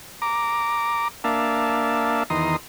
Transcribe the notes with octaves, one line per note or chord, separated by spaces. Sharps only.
A#5 D6
A#3 D4 E5 F5 A5
E2 D#3 A#5 C6 D#6